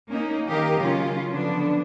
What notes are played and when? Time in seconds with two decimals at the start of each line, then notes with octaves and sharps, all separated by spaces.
0.10 A#3 C#4 D#4
0.47 D#3 D#4 G4 A#4 D#5 F5
0.78 C#3 F#3 C#4 F4
1.31 D3 F3 B3 D4